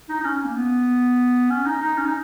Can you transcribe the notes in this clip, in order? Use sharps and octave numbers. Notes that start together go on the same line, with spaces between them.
D#4
D#4
C#4
A#3
B3
C#4
D#4
D#4
C#4
D#4